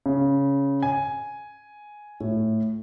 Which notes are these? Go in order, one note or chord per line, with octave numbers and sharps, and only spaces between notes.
C#3
G#5
A2